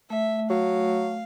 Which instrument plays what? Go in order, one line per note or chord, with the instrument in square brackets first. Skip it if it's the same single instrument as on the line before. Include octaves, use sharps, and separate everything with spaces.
[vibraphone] A3 [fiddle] E5
[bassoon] F#3 [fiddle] F5